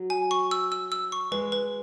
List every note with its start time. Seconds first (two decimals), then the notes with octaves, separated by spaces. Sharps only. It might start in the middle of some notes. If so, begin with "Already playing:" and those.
Already playing: F#3
0.10 G#5
0.31 C#6
0.51 E6
0.72 E6
0.92 E6
1.12 C#6
1.32 G#3 B4
1.52 B4